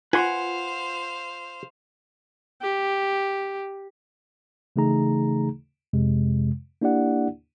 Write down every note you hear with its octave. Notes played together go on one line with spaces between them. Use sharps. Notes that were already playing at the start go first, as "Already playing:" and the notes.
F4 B4 C5 F5 F#5 G#5 C6
G4
C#3 E3 A3 D#4 G#4 A#5
F2 C3 G#3
A#3 D4 E4 G4 D5 F#5